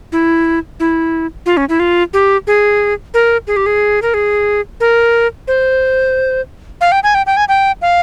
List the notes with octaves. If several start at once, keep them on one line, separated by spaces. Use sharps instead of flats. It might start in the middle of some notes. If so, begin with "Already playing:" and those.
E4
E4
F4
C#4
E4
F4
G4
G#4
A#4
G#4
G4
G#4
A#4
G#4
A#4
C5
F5
G5
G#5
G5
G5
G#5
G5
F5